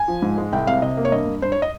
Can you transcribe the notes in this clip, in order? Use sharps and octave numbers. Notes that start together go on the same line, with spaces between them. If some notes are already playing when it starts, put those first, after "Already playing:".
Already playing: G#5
F3
G#2
G#3
C2 G5
C3 F5
C3 D#5
A#3
C#5
G2 D#5
G2
G2 C5
C#5
D#5